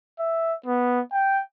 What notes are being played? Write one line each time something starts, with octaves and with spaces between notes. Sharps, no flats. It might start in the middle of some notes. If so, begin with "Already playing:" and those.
E5
B3
G5